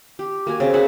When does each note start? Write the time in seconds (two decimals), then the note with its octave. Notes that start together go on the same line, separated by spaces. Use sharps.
0.19 G4
0.47 A#3 F#4 G#5
0.60 C#3 C4
0.74 G#4 E5 F#5 A5